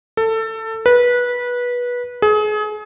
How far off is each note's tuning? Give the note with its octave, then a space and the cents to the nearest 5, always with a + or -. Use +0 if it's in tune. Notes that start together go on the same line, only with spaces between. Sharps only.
A4 +20
B4 -20
G#4 +30